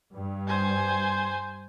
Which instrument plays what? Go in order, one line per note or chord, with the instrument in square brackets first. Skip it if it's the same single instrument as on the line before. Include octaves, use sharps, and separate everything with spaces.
[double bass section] G2
[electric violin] C5 G#5